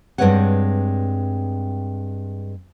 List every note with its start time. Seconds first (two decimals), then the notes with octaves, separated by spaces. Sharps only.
0.18 G2 G#3 C4 B4 C#5 F#5